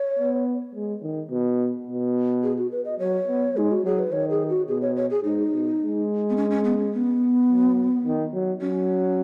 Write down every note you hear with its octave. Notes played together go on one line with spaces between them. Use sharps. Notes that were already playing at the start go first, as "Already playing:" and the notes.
Already playing: C#5
B3
G#3
D#3
B2
B2
G#4
F#4
B4
D#5
F#3 C#5
B3
G#3 D#4
F#4
F#3 G#4
B4
D#3 C#5
G#4
F#4
B2 G#4
C#5
C#5
G#4
G#2 D#4
B2
G#3
B3
C#4
C#4
B3
C#4
B3
F#3
D#3
F#3
F#3 C#4